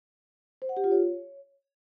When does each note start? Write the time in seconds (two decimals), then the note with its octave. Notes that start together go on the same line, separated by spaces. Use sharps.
0.62 C5
0.69 F#5
0.77 G4
0.84 F4
0.91 C#5